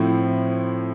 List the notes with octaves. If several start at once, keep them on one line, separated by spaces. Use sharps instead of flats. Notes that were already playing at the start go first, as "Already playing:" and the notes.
Already playing: A2 F3 C4 E4